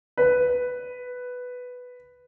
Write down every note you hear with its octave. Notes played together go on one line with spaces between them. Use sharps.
B4